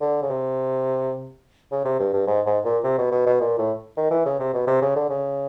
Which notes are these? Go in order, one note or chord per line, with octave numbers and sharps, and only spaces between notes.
D3
C#3
C3
C#3
C3
G2
G2
G#2
G#2
A#2
C3
B2
B2
B2
A#2
A2
D#3
E3
C#3
C3
B2
C3
C#3
D3
C#3